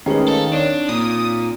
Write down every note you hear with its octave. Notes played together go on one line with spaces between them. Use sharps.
D#3 G#3 A3 C#4 D#4 G#4 B4
A4 C#5 F5 D#6
C4 D4 D#4 C#5
A#2 D#6